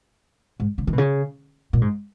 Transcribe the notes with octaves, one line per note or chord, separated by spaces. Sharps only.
G#2
C#3
D#3
B2
C#3
A#2
G#2